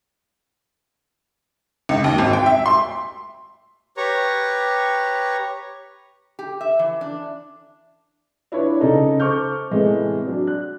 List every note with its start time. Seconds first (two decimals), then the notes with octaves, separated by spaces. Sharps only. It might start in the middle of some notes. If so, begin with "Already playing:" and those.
1.89 C#2
2.04 D#2
2.18 G#1
2.33 G5
2.46 E5
2.66 C6
3.97 G4 B4 C#5 A#5 C#6
6.39 G4
6.61 E5
6.79 E3
7.01 D4
8.52 D4 E4 F4 B4 C#5
8.81 C#2 C#3 D#4 A4 A#5
9.20 A4 C5 C#6 D6 F6 G6
9.71 A2 C3 E3 G#3 A3 B3
10.27 F#3 D4
10.47 F#6